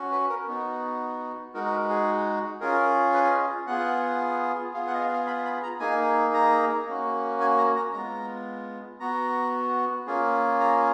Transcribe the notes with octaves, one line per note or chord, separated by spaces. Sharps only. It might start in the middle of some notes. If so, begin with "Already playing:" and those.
Already playing: C#4 F#4
B4
A#4
B3 D#4 F#4
G#3 D#4 F#4 A#4
A#4
B4
G#4
C#4 F4 G#4 A#4
B4
D#5
B3 F4 G#4 F#5
B3 F4 G#4 F5
F#5
D#5
F5
F5
B5
B5
A#5
A#3 D#4 G#4 G#5
A#5
A#3 C#4 F#4
G#5
A#5
A#5
G#3 B3 F4 A#5
B3 F#4 A#5
A#3 C#4 F4 G#4
A#5